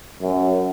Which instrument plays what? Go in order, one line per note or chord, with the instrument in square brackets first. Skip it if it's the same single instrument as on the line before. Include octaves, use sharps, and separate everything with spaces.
[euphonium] F#2